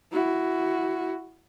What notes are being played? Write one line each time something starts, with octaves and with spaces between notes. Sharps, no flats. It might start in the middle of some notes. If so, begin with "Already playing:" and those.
E4 F#4